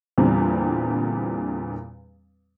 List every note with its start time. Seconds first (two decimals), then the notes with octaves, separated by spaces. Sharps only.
0.18 E2 A#2 D3 G3 C4